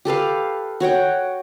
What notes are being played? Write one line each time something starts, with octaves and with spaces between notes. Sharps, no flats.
G4 A4 B4 F5
F#4 C#5 F#5 G5